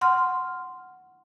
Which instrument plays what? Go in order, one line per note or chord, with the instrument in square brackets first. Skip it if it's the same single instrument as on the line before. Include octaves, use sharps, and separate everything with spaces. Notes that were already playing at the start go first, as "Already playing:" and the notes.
[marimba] F#5 C6 C#6 F6